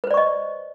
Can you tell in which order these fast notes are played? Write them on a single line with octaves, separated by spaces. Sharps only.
B4 C5 D5 C#6 D#5